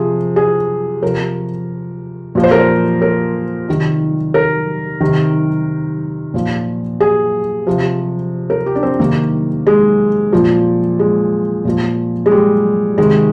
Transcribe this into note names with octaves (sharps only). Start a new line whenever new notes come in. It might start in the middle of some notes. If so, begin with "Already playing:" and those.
Already playing: C3 F3 G#4
G#4
C3 F3 A#4
A#2 F3
C5
A#4
C5
A#4
C3 D#3
A#4
C3 D#3
A#2 F3
G#4
C3 F3
A#4
G4
D4
C4
C3 D#3 A#3
G#3
A#2 F3
G#3
A#2 F3
G#3
G3
C3 D#3 G#3